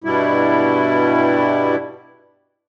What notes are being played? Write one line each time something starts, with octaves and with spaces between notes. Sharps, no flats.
G2 B2 G3 E4